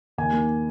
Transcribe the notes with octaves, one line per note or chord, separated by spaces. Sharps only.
D#2 G#5
A#3